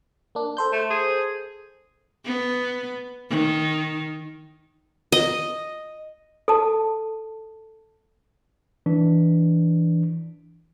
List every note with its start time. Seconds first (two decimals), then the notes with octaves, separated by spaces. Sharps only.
0.35 A#3 D4
0.57 A4 C5 G6
0.72 A3
0.90 G#4
2.25 B3
3.30 D#3
5.12 D#5
6.48 A4 A5
8.86 E3 D4